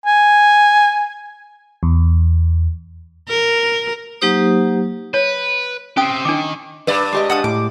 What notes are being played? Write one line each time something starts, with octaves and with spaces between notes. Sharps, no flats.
G#5
E2
A#4
F#3 A#3 D#4 G4 C5 D#6
B4 C#5
C4 C#4 G4 G5 D#6
D#3 D4 D6
G2 B4 D5
G#3 G4 D#5
D4 F#5 A5 D#6
A2 D6